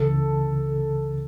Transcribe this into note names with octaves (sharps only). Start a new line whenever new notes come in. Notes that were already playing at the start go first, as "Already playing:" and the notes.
Already playing: C#2 C#3 E3 A4